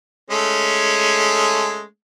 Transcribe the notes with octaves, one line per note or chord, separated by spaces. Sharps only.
G#3 A3 C#4